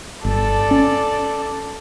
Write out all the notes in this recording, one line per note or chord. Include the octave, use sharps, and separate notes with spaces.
G1 A4 D5
C#4